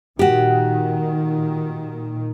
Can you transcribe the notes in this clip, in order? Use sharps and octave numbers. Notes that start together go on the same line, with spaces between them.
A#2 D#3 F#4 G4